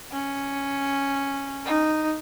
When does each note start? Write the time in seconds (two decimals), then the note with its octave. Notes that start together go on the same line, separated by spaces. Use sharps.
0.12 C#4
1.66 D#4